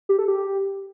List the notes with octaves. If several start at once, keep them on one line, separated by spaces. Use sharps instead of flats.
G4
A4
G4